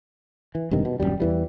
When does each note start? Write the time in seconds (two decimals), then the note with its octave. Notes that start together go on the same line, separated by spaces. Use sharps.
0.55 E3
0.71 E1 G2 C3 D#3
0.85 B2
1.00 D#1 C#2 F#2 G3
1.20 E2 E3 G3